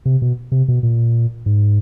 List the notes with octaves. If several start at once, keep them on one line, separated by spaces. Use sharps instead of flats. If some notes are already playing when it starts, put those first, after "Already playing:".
C3
B2
C3
B2
A#2
G#2